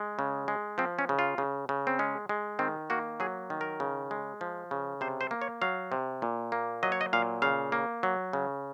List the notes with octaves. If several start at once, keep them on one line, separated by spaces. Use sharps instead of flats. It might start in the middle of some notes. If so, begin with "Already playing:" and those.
Already playing: G#3
C#3
G#3
F3 C4
C#4
C#3
F4
C#3
C#3
C4
G#3 C#4
G#3
D#3 C4
A#3 F#4
F#3 G#4
D#3
A#4
C#3
G#3
F3
C#3
C3 C5
C5
A#3
C#5
F#3 F5
C3
A#2
A#3
F#3 D#5
C#5
D#5
A#2 F5
C#3 F5
A#3
F#3
C#3